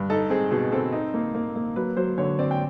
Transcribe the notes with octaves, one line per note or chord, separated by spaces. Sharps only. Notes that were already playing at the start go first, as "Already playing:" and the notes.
Already playing: G2
D#4 A4
C4 G#4
B2 G#4
C4 A4
D#4
A#3
A#3
A#3
F#3 B4
F#3 C5
D3 C#5
C4 D5
G5